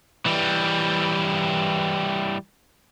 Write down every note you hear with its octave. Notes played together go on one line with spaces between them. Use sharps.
E3 G3